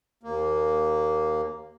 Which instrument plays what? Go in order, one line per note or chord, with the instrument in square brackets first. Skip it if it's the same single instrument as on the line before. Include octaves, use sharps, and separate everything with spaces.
[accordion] D#2 A#3